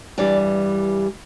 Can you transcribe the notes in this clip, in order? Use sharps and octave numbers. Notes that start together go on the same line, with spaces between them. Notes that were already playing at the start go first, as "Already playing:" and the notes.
G2 E3 G3 D5